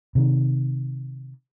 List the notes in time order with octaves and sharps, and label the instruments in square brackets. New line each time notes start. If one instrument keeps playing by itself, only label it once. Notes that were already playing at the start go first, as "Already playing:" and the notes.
[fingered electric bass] C3 D#3